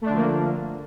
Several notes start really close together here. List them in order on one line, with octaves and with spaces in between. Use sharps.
A3 D4 D3 F3 A#3